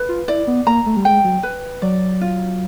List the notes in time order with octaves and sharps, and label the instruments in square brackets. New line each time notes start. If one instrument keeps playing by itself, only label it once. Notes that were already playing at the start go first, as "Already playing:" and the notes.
Already playing: [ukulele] B4
[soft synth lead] F4
[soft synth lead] E4 [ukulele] D5
[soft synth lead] B3
[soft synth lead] A#3 [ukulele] A#5
[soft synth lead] A3
G3
[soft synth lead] G#3 [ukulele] G5
[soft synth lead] F#3
[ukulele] B4
[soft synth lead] F#3 [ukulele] D5
[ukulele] F4